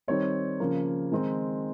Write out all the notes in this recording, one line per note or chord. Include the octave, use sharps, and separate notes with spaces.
D#3 G3 C4 D#4 C#5
C#3 F3 A#3
D#3 G#3 C4 D#4